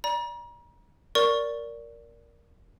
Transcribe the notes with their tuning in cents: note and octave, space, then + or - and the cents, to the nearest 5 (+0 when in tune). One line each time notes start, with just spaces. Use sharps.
D5 +0 A#5 +40
A#4 +0 D5 -15 C#6 +0